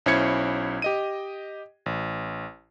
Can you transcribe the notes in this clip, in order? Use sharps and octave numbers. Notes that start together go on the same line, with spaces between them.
B1 C#4 E4 C5 G#6 C#7
G4 D#5 D#7
A1